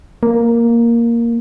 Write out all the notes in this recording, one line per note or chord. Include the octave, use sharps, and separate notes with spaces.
A#3